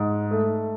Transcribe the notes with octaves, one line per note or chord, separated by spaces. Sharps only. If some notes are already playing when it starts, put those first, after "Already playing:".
Already playing: G#2
A3